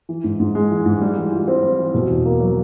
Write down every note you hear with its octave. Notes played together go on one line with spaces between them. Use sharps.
E3
G#2
G#2
G#3
E3
G#2
G3
E3
F4
C4
G3
E3
B2
E2
A#3
F#3